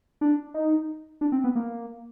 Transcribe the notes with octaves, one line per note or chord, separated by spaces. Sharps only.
D4
D#4
D4
C4
B3
A#3